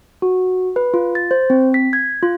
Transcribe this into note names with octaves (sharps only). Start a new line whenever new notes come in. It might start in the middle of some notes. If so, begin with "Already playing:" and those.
F#4
B4
F4
A6
C5
C4
B6
G#6
F4